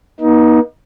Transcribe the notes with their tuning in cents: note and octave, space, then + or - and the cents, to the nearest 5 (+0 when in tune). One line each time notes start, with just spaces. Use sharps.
B3 -45 D#4 +15